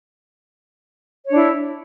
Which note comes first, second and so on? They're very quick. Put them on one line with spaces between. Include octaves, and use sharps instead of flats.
C#5 D4 E4